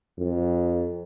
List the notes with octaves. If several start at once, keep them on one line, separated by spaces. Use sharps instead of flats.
F2